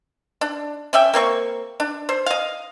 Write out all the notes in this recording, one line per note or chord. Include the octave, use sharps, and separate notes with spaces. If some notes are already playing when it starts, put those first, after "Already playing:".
D4
C#4 D5 E5 G5
A#3 C4 C#5 C#6
D4
C5
D#5 F5